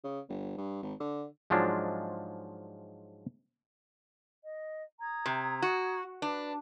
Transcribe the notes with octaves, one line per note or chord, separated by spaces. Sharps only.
C#3
G1
G2
G#1
D3
G#2 F3 F#3 G#3 D4 F4
D#5
A#5 D#6 G#6
C3
F#4
D4 B4